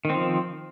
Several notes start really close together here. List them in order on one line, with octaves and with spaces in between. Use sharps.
D#3 C4 F3